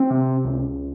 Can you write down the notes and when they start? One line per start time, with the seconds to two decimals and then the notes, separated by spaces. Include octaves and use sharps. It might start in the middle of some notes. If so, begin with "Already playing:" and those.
Already playing: C4
0.10 C3
0.44 C#2